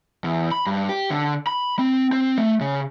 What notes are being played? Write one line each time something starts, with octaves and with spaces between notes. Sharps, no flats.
E2
B5
G2
G4
D3
B5
C4
C4
A3
C#3